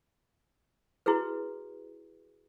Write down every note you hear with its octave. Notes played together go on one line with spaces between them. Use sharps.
E4 F#4 G#4 B4